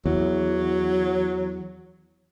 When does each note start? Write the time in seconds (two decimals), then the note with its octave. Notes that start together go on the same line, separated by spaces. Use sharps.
0.06 E2 F#3